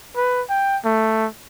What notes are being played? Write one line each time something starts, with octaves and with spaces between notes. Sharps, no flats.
B4
G5
A3